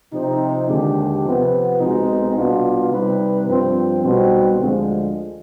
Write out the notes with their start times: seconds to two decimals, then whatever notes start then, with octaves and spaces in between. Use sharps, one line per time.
0.13 C3 F3 C4 D#4
0.69 D#2 D3 G#3 D4 G4
1.24 C3 F3 B3
1.79 B1 B2 G#3 C4 D#4
2.36 C2 B2 B3 D4 F4
2.91 C3 G3 C4 D#4 B4
3.48 G2 F3 C4
4.03 B1 B2 G3 C4
4.59 D2 D3 F3 G#3